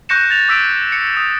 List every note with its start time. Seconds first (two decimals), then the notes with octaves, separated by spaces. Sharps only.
0.09 C#6 F#6 G6 A#6 C#7 E7
0.30 A6 F7
0.48 D6 E6 B6 D7
0.92 C#7
1.17 D#6